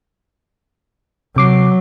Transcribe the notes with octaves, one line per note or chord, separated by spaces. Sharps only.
C3 F#3 D6 C7